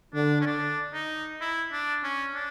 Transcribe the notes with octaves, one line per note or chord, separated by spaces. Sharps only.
D3 D4
C#4
D4
D#4
E4
D4
C#4
D4